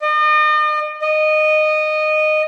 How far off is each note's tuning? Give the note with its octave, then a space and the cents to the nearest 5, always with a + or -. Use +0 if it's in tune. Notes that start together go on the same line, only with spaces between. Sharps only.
D#5 -40
D#5 -15